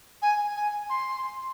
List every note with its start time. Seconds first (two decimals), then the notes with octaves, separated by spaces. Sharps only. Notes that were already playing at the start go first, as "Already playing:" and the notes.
0.21 G#5
0.56 G#5
0.89 C6